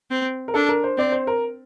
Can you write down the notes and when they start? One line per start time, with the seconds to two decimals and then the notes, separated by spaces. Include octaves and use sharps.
0.11 C4
0.48 A#4
0.54 D4 A4
0.69 A#4
0.84 C5
0.98 C4 D5
1.12 C5
1.27 A#4